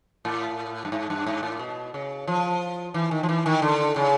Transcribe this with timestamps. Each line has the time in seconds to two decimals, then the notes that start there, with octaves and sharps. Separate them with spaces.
0.25 A2
0.85 G2
0.92 G#2
1.10 G2
1.26 G#2
1.43 A2
1.59 B2
1.94 C#3
2.27 F3
2.94 E3
3.11 D#3
3.23 F3
3.29 E3
3.46 D#3
3.62 D3
3.96 C#3